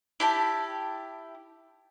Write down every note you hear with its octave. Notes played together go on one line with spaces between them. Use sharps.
E4 G4 A5